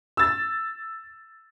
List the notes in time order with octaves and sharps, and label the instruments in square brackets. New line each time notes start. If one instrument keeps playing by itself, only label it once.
[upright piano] E6 A6